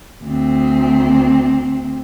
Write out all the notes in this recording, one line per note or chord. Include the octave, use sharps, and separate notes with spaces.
D2 C4